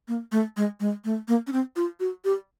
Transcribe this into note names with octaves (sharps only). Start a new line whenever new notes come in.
A#3
A3
G#3
G#3
A3
A#3
C#4
C4
F4
F#4
G4